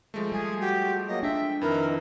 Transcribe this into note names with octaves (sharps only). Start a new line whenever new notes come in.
F3 G#3 A3
G3 G#4
F#4 G4
F#3 A#3 D#5
D4 E5 G5
F2 D#3 E4 A#4 B4